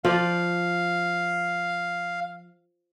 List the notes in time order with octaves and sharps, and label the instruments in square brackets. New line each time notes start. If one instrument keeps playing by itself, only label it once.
[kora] F3 D5 [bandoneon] F5